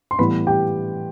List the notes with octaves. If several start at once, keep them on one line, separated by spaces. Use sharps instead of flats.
C6
A2 E3 G3 B3 E4 B4 B5
G4 G5